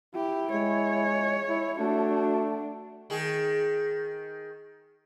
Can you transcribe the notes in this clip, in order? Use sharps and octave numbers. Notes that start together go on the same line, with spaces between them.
E4 G4
G#3 C#5
E4
A3 D4 F#4
D#3 G#4